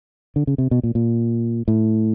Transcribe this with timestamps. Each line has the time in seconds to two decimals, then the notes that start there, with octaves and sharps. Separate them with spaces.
0.36 D3
0.47 C#3
0.58 C3
0.71 B2
0.83 A#2
0.95 A#2
1.68 A2